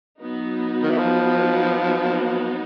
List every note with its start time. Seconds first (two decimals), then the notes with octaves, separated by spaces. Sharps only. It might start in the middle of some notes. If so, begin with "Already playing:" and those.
0.19 F#3 B3 D#4 F#4
0.83 D#3
0.90 E3
0.98 F3